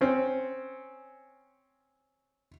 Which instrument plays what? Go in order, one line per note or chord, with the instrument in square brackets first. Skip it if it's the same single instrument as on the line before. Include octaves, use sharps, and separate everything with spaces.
[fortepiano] C4 C#4